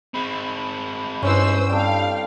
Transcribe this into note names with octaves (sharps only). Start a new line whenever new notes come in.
G#3 C4 B5
G2 E3 C#4 B4 C5 E6
G3 C4 A4 F5 G5